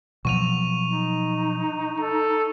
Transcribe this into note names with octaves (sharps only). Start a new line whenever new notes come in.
B2 F3 F#3 C#6 D#7 F7
D#4
A4